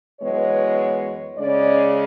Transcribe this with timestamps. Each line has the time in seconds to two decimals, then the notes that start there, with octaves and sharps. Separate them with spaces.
0.20 F#2 E3 G#3 B3 C#5
1.37 C#3 G#3 C#4 D5